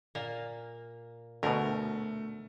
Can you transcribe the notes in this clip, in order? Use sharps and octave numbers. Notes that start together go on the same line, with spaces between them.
A#2 A#3
D2 B2 A3 A#4